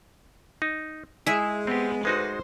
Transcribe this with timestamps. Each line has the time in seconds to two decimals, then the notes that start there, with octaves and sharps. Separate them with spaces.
0.62 D#4
1.26 G#3 E4 G#4 E5
1.67 B3 C4 G4
2.05 D2 G#3 D#4 F#4 B4 C5